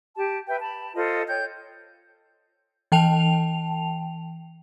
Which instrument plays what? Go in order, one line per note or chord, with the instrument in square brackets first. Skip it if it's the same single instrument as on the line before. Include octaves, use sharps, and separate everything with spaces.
[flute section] G4 A5
B4 E5 G5
A5 B5
F4 A4 C5 D#5
C#5 G5 G6
[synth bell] E3 G5 A5 F7